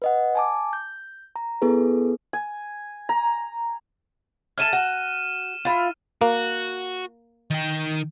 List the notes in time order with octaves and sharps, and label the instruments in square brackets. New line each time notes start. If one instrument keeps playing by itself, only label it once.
[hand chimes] B4 D#5 F#5
G#5 A5 D6
G6
A#5
B3 E4 G#4 A4 B4
[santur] G#5
A#5
[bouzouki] A4 E5 G#5 [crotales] F6 D#7 E7
[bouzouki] F#4
E4 F4
[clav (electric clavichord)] A#3 [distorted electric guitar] F#4
[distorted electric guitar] D#3 G5